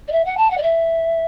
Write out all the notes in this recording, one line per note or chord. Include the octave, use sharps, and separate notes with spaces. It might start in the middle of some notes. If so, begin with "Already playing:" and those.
D5
E5
F#5
A5
F#5
D5
E5